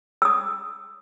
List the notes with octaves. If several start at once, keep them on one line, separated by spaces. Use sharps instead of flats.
D#6 E6